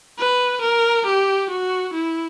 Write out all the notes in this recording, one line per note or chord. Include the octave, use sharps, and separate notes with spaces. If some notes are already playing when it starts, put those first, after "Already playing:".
B4
A#4
G4
F#4
E4